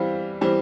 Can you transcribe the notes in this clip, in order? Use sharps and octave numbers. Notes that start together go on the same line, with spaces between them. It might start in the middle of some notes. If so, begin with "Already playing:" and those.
Already playing: E3 G3 C4 F5
E3 G3 C4